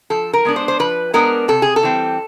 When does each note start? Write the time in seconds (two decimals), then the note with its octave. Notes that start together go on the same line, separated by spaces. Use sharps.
0.10 F3 A4
0.33 A#4
0.45 G#3 B3 D4
0.56 C5
0.68 C5
0.79 F3 B4
1.14 G#3 B3 D4 A#4
1.48 C3 A4
1.62 G#4
1.76 A4
1.83 E3 G3 C4